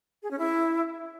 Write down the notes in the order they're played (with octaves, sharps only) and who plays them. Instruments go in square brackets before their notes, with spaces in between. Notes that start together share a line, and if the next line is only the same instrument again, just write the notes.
[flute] G#4
C#4
E4